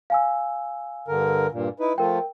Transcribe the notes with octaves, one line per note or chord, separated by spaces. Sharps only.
F5 G#5 E6
G2 D3 A#4
G2 A#2
D#4 E4 B4
F3 A3 F4 A#4 G5